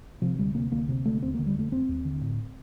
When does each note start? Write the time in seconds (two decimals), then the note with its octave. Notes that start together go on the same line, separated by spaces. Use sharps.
0.22 C3 F3
0.38 D2 G3
0.55 C3 A#3
0.72 D2 A#3
0.88 C3
1.05 D2 A3
1.22 D#2 C4
1.35 A#3
1.39 D3
1.47 G3
1.55 F1 A3
1.72 F1 C4
1.89 D#2
2.05 D3
2.21 A2